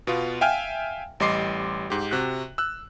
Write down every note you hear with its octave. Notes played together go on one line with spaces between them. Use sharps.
B2 B3 F4
E5 F5 G5 G#5 F6
A1 G3 D#5 C6 D6 C7
G#2 G4
C3 F#4 F#6
E6 F#6